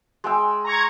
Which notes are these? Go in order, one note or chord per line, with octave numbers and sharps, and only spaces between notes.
G#3 G5 E6
A#5 C#6 G#6